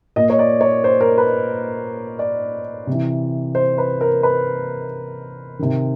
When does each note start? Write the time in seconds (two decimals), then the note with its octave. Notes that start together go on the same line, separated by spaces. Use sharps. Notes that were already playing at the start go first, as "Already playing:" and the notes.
0.16 A#2 D#5
0.30 C#5
0.39 D5
0.61 C#5
0.84 C5
1.01 A#4
1.18 B4
2.19 D5
2.87 C3
2.92 E3
3.55 C5
3.78 B4
4.01 A#4
4.23 B4
5.59 C3 D#3